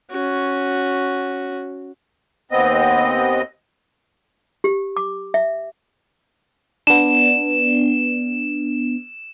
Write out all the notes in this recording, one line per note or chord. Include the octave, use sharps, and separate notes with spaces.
C#4 F#4
D#2 B3 C4 D#5
G4
D6
E5
B3 D4 E7